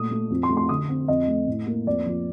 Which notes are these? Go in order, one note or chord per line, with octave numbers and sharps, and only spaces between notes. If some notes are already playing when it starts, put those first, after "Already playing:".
Already playing: A#2 A3 D#6
A3
F2
C6
A3
C6
D3 D#6
C4
F2 D#5
A3
A2
A#3
F2 D5
F3